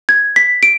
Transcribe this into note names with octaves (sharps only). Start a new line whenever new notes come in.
G#6
B6
D7